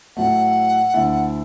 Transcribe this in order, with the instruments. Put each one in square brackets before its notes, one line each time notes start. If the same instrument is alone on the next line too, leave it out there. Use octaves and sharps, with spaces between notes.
[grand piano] A2 F#3 A3 [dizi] F#5
[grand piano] D2 D3 A3 E4